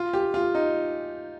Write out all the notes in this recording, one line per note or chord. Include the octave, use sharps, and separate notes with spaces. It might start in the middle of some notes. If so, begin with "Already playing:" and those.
Already playing: F4
G4
F4
D#4